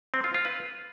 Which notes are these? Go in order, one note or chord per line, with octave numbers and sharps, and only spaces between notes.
C4
F4
F4
B4